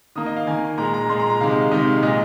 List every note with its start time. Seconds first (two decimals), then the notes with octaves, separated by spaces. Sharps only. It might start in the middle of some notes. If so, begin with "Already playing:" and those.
0.16 D#3 A#3 D#6
0.26 D#5
0.37 F5
0.47 D#3 A#3 G#5
0.78 A#2 G#3 A#5
0.94 A#5
1.09 A#2 G#3 C6
1.19 A#5
1.30 A#5
1.41 C3 D#3 G#3 F5
1.51 D#5
1.61 F5
1.71 C3 D#3 G#3 D#5
1.87 F5
2.02 A#2 G#3 D#5